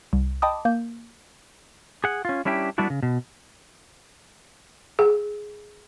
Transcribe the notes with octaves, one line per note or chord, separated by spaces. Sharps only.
C2
D#5 G5 A5 B5 D6 D#6
A#3 G6
G#4 F#5
C#4 F4
G3 C#4 D4 E4 G4
G3 A3 B3 D4 E4 F#4
C#3
B2
G#4